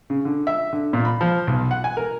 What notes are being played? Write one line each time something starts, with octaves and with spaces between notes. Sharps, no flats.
C#3
D3
E5
D3
A#2
B5
F3
B1
F#5
G#5
A#4